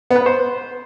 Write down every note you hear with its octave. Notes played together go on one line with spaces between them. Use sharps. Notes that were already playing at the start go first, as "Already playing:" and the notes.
B3
B4
B3
C5